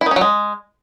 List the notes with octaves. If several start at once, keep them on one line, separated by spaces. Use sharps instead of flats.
E4
D#3
C#4
F#3
G#3